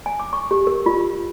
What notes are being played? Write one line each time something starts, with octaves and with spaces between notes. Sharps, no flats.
G#5
D6
C#6
G4
A#4
F4